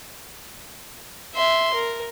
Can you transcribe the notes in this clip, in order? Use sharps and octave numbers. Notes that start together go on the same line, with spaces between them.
E5 C6
A#4